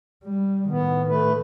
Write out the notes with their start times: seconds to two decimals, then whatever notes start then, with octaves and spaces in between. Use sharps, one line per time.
0.24 G3
0.69 A2 D#3 B3
1.08 A3 B4